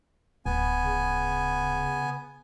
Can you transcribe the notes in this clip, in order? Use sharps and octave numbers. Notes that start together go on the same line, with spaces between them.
D1 B3 G#5
C#3